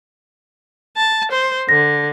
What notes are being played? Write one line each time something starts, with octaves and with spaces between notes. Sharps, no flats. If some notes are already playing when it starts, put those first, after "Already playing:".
A5
C5
D3 A#6